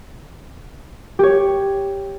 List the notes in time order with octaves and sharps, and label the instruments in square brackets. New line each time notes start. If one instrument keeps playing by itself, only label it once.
[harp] G4 C#5